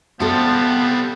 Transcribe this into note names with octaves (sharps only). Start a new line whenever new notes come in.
F3 G3 A3 B3 C4 A4